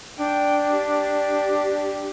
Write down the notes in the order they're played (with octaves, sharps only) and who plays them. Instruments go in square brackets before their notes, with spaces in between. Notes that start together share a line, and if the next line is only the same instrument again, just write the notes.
[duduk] D4 [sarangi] G5
[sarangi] G4